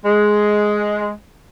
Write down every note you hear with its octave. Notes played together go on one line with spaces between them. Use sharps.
G#3